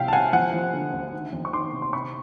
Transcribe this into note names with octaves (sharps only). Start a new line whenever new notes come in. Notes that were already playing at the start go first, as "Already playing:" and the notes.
Already playing: C2 F3 E5 F5 G5
A5
C2 F#5 G#5
F3 F#5 G#5
F3
D3
D2
D#3
F2
C#6
D#3 C6 D6
C3
C6
C3 B5 C#6